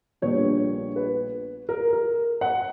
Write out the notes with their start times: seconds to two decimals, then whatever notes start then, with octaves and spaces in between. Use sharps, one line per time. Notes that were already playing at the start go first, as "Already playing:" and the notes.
0.22 A#1 A#2 G3 B3 D4 C#5
0.96 B4
1.69 A#4
1.93 A#4
2.41 F#5